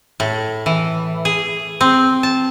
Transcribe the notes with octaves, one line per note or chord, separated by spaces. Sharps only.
A2
E3
G#4
C4
A5